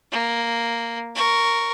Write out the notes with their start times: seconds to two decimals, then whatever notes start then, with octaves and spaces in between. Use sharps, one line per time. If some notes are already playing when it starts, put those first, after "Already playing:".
0.12 A#3
1.15 A#4 C#6